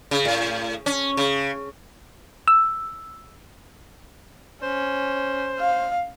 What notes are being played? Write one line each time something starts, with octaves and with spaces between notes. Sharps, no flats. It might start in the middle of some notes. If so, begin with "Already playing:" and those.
C#3
A2
C#4
C#3
E6
C#4 C5
F5